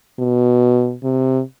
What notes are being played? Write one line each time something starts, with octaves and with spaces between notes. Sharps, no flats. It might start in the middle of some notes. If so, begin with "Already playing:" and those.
B2
C3